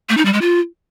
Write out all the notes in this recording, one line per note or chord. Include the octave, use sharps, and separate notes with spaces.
A3
D#4
G3
G#3
F4